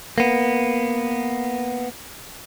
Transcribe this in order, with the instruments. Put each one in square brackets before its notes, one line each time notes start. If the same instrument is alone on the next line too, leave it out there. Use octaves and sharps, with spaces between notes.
[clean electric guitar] A#3 B3